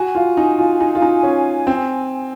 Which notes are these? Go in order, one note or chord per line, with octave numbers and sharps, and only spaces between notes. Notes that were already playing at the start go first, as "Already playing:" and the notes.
Already playing: F#4 G#5
F4
D#4
F4
D#4
F4
D#4
C#4
C4